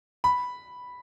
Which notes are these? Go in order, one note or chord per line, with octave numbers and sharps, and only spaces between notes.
B5